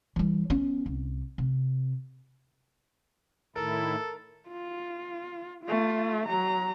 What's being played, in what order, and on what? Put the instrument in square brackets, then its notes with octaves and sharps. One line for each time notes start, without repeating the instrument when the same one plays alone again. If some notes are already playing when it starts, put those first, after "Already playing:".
[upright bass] E3 G3
B3 C#4
C2
C3
[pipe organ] A2 D#3 E4 [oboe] A4 [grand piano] A#4
[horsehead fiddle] F4
A3 F4
F#3 A#5